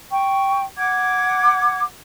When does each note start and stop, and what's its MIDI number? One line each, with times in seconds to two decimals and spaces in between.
0.10 0.61 79
0.10 0.61 85
0.77 1.81 78
0.77 1.81 86
0.77 1.81 92